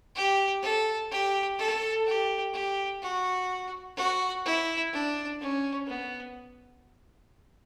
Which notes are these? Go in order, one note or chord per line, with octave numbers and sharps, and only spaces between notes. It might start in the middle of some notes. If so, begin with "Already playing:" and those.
G4
A4
G4
A4
G4
G4
F#4
F#4
E4
D4
C#4
B3